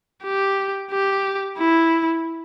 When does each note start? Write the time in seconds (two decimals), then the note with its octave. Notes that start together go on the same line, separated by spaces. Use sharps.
0.24 G4
0.91 G4
1.58 E4